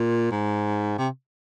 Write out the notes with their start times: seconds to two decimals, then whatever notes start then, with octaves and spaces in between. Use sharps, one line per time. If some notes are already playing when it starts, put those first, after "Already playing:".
Already playing: A#2
0.31 G#2
0.98 C3